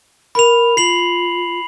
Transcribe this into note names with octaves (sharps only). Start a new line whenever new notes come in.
A#4 B5 F7
F4 C7 F#7